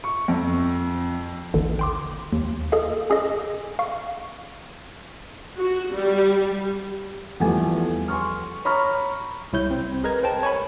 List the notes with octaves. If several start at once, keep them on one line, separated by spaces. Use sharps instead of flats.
C#6
F2
A1 D#2 D3
G5 C6 D6
D#2
G#4 A4 D#5 F5
C#4 G#4 A4 D#5
F5 C#6
F#4
G3
E2 F3 G3 A3 G#5
G#5 C6 C#6 F6
C#5 A#5 B5 C#6 F6
C2 E4 C#5 G6
C4
G#4 A#4 B4 D#5 A#5 G#6
C5 G5 A5
C#5 G#5 B5